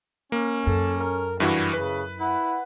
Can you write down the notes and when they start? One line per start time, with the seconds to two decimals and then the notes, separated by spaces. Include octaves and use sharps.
0.32 A#3 C#4
0.66 F#2 A4
0.97 A#4
1.40 G2 E3 E4 F#4
1.73 C#3 B4
2.20 E4 F#5